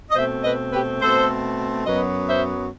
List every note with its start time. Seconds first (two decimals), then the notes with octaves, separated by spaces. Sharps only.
0.10 D#5
0.15 B2 A3 C4 C5 E5
0.43 B4 D#5
0.72 G4 B4
1.00 B2 A3 C4 A4 C5
1.86 F#2 F#3 B3 B4 D#5
2.29 C5 E5